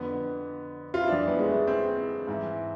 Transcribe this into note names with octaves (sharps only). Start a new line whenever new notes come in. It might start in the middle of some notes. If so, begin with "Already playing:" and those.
Already playing: F2 D3 B3
F4
E4
F2 E3 D4
B3
G#3
A3
C4
G#2 E3